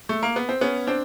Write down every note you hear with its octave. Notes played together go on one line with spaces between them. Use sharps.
A3
A#3
B3
C4
B3 C#4
C4 D4